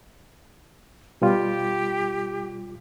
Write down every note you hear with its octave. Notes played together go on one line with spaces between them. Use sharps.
B2 G3 F4 G4